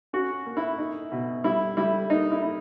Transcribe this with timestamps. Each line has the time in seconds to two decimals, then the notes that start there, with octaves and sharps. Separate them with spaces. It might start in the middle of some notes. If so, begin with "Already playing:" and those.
0.13 C#4 F#4
0.46 A#3
0.57 E4
0.78 D#4
1.12 B2
1.44 G3 E4
1.77 G3 E4
2.10 A#3 D#4
2.32 E4
2.42 D#4